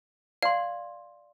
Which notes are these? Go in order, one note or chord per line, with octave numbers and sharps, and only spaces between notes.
D5 F5 C6